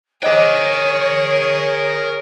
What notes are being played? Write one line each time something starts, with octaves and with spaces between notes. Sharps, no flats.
G#4 A#4 C5 C#5 D#5 G5 D6